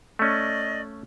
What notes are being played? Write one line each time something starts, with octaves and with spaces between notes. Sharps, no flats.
A3 C#4 D5 D#5